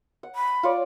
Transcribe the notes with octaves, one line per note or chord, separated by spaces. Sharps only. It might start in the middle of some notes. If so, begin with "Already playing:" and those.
F#5
B5
F4 C#5 D5